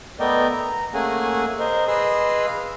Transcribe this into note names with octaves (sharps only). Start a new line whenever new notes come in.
A3 B3 A#4 D5 D#5 G5
A#5
A3 A#3 C#4 G#4 F#5 G#5
A#4 C5 D#5
G#4 B4 D#5 C6 E6
F5